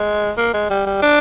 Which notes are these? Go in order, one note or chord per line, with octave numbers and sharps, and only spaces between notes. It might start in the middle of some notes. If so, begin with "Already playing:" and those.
Already playing: G#3
A#3
G#3
G3
G3
D4